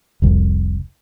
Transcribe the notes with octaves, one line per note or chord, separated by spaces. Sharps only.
F1 C2